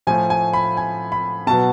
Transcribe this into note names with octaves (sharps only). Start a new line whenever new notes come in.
A2 F3 A3 G#5
G#5
B5
G#5
B5
B2 F#3 B3 A5